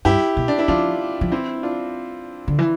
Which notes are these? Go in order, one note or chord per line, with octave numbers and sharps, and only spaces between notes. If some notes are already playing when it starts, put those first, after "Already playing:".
G2 E4 G4
B2
D4
E4
F3 D4 F4
F3
E3 C4 E4
D4 F4
D3
E3